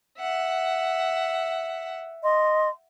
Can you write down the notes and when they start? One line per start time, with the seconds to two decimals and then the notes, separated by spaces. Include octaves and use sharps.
0.18 E5 F#5
2.23 D#5 C6